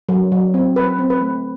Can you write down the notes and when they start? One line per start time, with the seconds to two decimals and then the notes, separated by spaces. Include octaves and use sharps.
0.09 F#3
0.32 F#3
0.54 C4
0.76 F#3 B4
0.99 C4
1.10 B4
1.21 A3